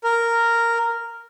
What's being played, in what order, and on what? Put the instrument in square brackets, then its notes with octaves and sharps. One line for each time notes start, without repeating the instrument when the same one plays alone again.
[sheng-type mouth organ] A#4